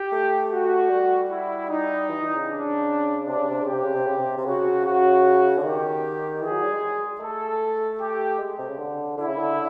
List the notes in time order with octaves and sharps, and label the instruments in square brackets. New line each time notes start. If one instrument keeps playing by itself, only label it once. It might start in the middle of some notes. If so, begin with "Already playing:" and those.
Already playing: [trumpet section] G4
[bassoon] A3
[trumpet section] F#4
[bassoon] G3
[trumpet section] E4
D#4
[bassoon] E3
E3
C#3
[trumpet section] D4
[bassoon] C3 [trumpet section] D4
[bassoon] C#3
C3
[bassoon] C#3 [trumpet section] G4
[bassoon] C3
C#3
C3
C#3
C3
C3
[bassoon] C#3 [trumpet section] F#4
[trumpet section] F#4
[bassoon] D3
[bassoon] D#3 [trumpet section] G4
[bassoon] E3 [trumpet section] G#4
[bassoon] F#3
G3
G#3
[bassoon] A3 [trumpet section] A4
[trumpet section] G4
[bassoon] G#3
C3
C#3
D3
[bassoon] D3 [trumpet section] E4
[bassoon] C#3
D3